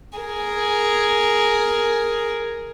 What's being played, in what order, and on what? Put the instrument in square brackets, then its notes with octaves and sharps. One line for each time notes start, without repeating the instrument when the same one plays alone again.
[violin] G#4 A#4